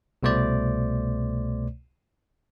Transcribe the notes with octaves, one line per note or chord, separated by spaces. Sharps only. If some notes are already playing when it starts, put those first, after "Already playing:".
C2 B2 A3 C5 D5